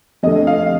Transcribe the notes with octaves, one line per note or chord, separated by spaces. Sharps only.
F2 D3 A3 D#5
F5